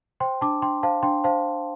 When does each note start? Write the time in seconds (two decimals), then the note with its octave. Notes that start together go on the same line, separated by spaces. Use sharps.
0.20 C5 G5 C6
0.41 D4 A5 D6
0.62 D4 G5 C6
0.83 C5 F5 A5
1.03 D4 G5 C6
1.24 C5 F5 A5